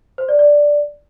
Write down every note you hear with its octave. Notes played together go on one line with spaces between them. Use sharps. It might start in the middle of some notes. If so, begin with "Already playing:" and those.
C5
D5
D5